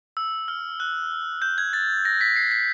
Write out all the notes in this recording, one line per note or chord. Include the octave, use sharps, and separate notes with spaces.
E6
F6
F#6
G6
G#6
A6
A#6
B6
C7
B6